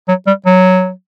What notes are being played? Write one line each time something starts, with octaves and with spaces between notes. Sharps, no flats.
F#3
G3
F#3